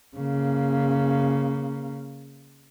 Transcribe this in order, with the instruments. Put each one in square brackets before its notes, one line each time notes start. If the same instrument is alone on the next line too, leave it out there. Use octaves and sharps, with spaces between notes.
[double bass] C#3 A#3